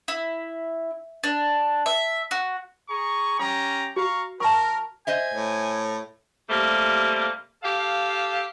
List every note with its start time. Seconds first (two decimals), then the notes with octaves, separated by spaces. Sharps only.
0.08 E4
1.24 D4
1.86 E5
2.31 F#4
2.89 G#4 A#5 C#6
3.39 C#4 G4 A#5 D6
3.96 F#4 F5 A#5 C#6
4.40 A#4 A5 C#6
5.07 C5 D#5 E5 G#5
5.34 A2
6.49 C3 G3 A3 A#3
7.63 G4 A4 F5